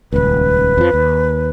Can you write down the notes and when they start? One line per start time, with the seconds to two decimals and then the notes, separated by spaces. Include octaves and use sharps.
0.13 D#1 C#2 B4
0.78 F2 F3
0.94 D#2